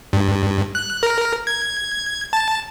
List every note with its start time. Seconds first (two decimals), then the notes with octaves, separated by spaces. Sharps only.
0.13 G2
0.75 F#6
1.03 A#4
1.47 G#6
2.33 A5